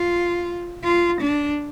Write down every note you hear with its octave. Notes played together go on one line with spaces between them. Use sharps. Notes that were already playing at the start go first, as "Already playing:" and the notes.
Already playing: F4
F4
D4